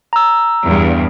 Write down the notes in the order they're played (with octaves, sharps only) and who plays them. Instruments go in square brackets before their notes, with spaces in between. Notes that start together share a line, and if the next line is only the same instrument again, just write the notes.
[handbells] A#5 E6
[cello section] E2 G2